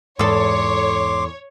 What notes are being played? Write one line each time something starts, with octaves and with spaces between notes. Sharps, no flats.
E2 G#2 A4 C#5 C6 D6